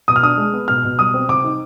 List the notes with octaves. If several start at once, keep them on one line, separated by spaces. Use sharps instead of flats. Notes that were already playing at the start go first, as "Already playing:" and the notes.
B2 D#6
F6
D4 D#6
G#3
B3
B2 F6
B2
G3 D#6
C4
C3 D6
D#4